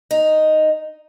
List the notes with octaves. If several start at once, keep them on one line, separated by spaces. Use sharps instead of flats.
D#4